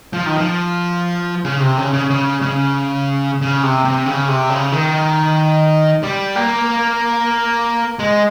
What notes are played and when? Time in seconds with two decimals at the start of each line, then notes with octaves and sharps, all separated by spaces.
0.13 F3
0.26 D#3
0.38 F3
1.45 C#3
1.60 C3
1.77 C#3
1.93 C#3
2.10 C#3
2.42 C#3
3.41 C#3
3.63 C3
3.85 C3
4.06 C#3
4.28 C3
4.50 C#3
4.72 D#3
6.03 G3
6.36 A#3
7.99 G#3